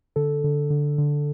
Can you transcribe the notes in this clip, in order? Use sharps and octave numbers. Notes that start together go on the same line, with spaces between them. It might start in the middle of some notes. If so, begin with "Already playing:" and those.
D3 A4
D3
D3
D3